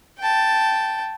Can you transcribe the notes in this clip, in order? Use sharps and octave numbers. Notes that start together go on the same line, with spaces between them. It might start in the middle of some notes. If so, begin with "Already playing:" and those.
G5 A5